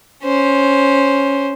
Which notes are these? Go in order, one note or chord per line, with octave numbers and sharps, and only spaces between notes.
C#4 C5